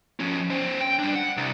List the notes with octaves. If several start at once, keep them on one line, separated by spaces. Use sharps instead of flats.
F3 C#4
C#4 C5
G5
G3 D4
F#5
C2